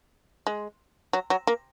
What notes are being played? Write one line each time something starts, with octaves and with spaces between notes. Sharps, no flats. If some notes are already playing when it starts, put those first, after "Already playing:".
G#3
F#3
F#3
A#3